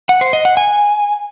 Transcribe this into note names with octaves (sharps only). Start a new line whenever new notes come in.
F#5
C5
D#5
F#5
G#5